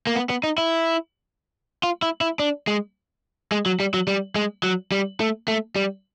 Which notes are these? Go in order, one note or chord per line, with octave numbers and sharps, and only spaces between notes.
A#3
B3
B3
D#4
E4
F4
E4
E4
D4
G#3
G#3
F#3
G3
F#3
G3
G#3
F#3
G3
A3
A3
G3